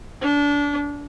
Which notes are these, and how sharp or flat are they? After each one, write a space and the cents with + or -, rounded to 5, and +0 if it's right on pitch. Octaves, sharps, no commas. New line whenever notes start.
D4 -25